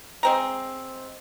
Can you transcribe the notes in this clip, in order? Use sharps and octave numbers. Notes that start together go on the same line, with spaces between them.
G#3 C4 A#5